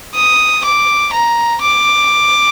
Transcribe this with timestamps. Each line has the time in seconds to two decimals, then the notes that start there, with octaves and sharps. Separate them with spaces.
0.15 D#6
0.65 D6
1.13 A#5
1.62 D6